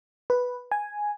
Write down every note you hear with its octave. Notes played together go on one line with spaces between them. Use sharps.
B4
G#5